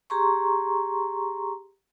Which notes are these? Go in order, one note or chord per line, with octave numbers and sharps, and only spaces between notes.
G4 G#4 A#5 C6 C#6